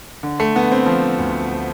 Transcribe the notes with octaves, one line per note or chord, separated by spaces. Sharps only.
D3
A3
D3 B3
C4
F3
D2